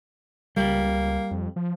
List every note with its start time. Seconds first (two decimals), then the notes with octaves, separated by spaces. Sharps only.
0.57 C#2 G3 A#3
1.31 F2
1.56 F3